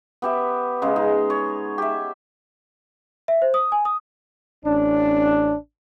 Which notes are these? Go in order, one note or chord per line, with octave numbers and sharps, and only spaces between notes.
B3 G4 E5
C#3 G#3
D#4
C#5
G4 E5
E5
C5
D#6
G#5
D#6
A1 C#4 D4